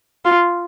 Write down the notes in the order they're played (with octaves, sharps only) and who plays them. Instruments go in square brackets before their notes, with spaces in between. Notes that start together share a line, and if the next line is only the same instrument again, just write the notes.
[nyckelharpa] F4